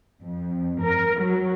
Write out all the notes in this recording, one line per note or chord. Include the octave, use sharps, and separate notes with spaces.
F2
A#4
F#3